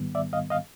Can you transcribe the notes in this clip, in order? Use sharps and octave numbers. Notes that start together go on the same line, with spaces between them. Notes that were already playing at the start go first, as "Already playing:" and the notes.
Already playing: G#2 D#3 G3 B3
D5 E5
D#5 F5
D#5 F5